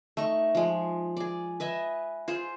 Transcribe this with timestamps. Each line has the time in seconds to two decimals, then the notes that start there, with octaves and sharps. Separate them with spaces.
0.17 A3 D#4 C#6
0.55 F3 G#3
1.17 G#4 D5
1.60 B4 D#5 E5 G#5
2.28 F4 G#4 C5